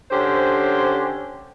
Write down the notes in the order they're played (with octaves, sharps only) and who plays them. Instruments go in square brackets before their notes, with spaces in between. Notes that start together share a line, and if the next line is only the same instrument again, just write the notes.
[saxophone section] D3 C#4 G4 C5